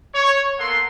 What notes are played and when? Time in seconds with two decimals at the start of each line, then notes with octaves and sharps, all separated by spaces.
0.14 C#5
0.58 A#3 B3 A4 F#5 C6